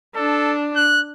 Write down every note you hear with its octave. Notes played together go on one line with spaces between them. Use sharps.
D4 A4
F#6